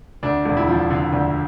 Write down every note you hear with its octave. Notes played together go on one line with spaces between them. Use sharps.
D2 D4
E1
E4
F3
D3
D2